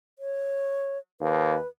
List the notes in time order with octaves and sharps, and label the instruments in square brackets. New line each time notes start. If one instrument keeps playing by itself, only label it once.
[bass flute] C#5
[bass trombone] D#2 [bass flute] B4